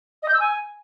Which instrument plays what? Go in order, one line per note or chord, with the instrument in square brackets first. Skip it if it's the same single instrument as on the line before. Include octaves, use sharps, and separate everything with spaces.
[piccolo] D#5
G6
E6
G#5